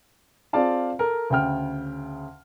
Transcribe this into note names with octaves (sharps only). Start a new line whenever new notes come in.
C4 F4 G#4 D5 F5 A5
A4 A#4
D2 C#3 G5 F6